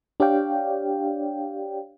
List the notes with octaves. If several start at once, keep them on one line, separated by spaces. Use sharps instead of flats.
D4 G4 C#5 D5 F5 G5